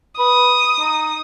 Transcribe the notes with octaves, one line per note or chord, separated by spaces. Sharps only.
B4 D#6
D#4